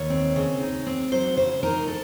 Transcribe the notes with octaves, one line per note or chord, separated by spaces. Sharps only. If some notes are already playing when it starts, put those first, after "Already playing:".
Already playing: D#2 C#5
C4
C#3
D#4
C4
F#3 C5
C#3 C5
D#4 A#4
A4